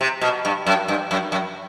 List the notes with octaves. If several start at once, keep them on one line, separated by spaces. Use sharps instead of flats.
C3
B2
G2
F#2
G2
F#2
F#2